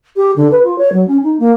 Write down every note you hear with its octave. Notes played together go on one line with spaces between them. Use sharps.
G4
D3
B4
F4
C#5
F#3
C#4
D#4
A#3